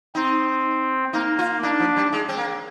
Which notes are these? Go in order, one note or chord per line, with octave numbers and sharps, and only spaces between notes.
C4 D#4
A#3 D#4
F4
D4 D#4
F3
G3
G#3
C4
A#3